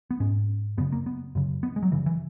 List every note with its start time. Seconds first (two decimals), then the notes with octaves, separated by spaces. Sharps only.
0.11 B3
0.20 G#2 C#4
0.78 F#2 C#3 B3
0.92 A#3
1.06 B3
1.35 F#2 C#3
1.63 B3
1.76 G#3
1.83 F#3
1.92 F#2 C#3 E3
2.06 E3